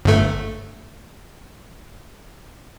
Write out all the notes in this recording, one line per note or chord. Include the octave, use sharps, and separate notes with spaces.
G1 A3